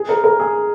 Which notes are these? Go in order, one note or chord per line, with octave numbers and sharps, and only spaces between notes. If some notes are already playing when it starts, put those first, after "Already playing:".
Already playing: G#4
A#4
A#4
G#4